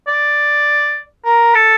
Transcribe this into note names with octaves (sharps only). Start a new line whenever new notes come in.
D5
A#4
A4